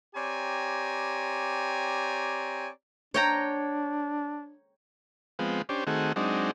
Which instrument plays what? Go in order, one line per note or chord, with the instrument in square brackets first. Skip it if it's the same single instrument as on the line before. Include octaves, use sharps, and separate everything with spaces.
[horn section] C4 G4 C#5 D5 G#5 A#5
[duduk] D4 [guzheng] C#5 G5 A#5
[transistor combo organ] F3 G#3 B3 C4
C#4 D4 G4 C5
D#3 A3 C4 F#4 G#4
F#3 G#3 C4 D4 D#4